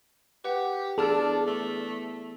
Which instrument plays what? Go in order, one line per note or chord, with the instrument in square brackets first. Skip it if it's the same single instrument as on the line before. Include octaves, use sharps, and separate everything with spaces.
[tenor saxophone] G4 [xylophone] B4 F#5
[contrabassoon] E2 [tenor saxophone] D4 [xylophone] G#4 A5 F6 [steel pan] A4
[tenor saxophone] A3